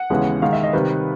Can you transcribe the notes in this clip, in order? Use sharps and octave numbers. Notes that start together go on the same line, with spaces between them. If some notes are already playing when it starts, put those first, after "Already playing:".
Already playing: F#5
D#2 C#3 E3 G#3 B3
D#2 D#3 G#3 F5
E5
D#5
C3 D#3 G3 B4